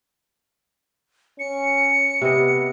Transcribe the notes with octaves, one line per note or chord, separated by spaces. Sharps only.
C#4 C#7
C3 B3 D#5